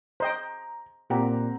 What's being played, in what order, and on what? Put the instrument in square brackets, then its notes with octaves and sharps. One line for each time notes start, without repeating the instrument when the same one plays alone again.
[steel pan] C5 D#5 G5 [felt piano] A#5
[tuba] A#2 [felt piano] C4 F#5 A#5 [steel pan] G4